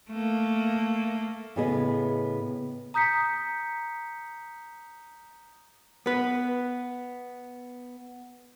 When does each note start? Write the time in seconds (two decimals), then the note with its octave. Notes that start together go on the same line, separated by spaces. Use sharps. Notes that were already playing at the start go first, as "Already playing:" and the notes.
0.10 A3 A#3
1.56 A2 C#3 B3 G#4 D#5
2.94 A#5 D#6 G6 B6 C#7
6.06 B3 B4